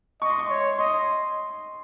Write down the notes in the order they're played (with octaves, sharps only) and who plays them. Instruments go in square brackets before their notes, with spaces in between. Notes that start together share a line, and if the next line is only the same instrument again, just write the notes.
[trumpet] D#5 [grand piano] C#6
[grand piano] C6
C#6
[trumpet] C#5
[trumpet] D#5 [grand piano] C6